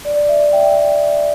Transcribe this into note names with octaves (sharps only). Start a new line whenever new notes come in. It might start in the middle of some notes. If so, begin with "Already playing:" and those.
D5
E5
G5